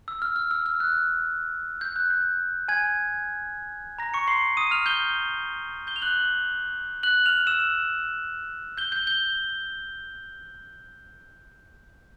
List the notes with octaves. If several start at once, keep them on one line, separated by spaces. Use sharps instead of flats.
E6
F6
F6
E6
F6
F#6
G6
F#6
G6
G#5 G#6
A#5 A#6
C#6 C#7
C6 C7
D#6 D#7
F6 F7
G6 G7
G6 G7
F7
F#6 F#7
F#6 F#7
F6 F7
E6 E7
G6 G7
G6 G7
G6 G7